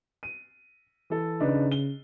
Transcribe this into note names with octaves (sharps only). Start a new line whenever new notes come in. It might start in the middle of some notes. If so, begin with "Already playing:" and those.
D#7
E3 A4
C#3 D4 D#4 B4
G7